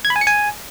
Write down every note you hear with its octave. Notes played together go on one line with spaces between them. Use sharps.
G#6
B5
G#5
C#7
G#5